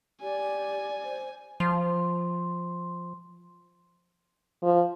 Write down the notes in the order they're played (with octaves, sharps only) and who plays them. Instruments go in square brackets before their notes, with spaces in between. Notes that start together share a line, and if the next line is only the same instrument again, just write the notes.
[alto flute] G4 [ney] D5 [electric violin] G#5
[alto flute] C5
[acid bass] F3 [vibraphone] C6
[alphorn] F3